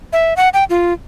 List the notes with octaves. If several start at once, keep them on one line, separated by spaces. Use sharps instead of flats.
E5
F#5
G5
F4